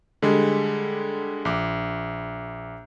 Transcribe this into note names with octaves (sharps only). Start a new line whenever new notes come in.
D3 G3 G#3
A#1 D6